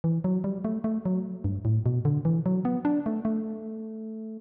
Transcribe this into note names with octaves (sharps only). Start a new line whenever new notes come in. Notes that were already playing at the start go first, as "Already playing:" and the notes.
E3
F#3
G3
A3
A3
F#3
G2
A2
B2
D3
E3
F#3
B3
D4
A3
A3